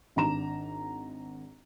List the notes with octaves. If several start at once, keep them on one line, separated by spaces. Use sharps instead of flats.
G#1 D4 A#5 E7